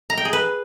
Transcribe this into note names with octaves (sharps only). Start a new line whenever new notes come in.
A#5
G5
G#4
B4